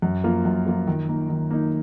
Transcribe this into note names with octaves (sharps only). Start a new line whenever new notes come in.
F#2
F3 A#3 F4
F#2
F3 A#3 F4
D#3
A#3 D#4
D#3
A#3 D#4